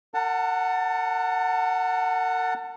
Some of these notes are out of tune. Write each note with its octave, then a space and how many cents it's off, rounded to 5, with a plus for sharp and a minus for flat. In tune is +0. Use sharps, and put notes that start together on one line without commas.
A#4 -35 F#5 +0 A5 +20